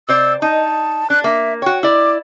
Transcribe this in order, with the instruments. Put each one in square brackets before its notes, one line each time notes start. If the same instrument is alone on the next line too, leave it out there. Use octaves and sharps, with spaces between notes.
[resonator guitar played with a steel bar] C3 C5 D5 [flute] E6
[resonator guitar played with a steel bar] D#4 [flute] A5
[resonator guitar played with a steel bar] D4 [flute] F#6
[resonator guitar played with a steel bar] A#3 [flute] E5
[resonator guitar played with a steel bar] F#4 C#5 [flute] G5
[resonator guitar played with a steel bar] E4 D5 [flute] D6